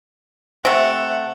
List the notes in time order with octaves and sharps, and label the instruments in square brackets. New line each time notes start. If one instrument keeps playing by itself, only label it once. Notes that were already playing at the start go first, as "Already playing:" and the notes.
[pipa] C3 A3 [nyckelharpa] F#5